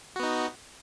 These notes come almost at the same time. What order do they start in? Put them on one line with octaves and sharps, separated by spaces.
F#4 B3 D#4